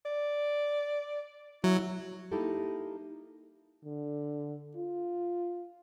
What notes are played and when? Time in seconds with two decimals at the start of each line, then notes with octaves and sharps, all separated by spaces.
0.05 D5
1.64 F#3 E4
2.32 A#3 D#4 E4 G4 A4
3.85 D3
4.76 F4